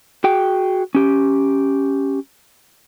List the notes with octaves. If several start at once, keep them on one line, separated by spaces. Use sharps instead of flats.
F#4 G#4 G5
C#4 G4